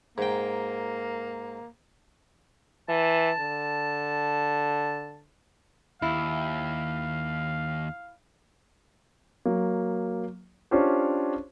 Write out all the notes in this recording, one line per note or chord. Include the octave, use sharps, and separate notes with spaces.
G#2 A#3 G5
E3 A5
D3
D#2 E4 F5
F#3 A#3
C#4 D4 F4 G4 C5 C#5